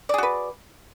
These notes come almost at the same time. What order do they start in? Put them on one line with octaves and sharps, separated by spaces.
D5 G#4 F#4 B4